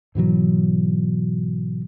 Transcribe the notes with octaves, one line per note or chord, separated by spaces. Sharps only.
G#2 B2 E3 F#3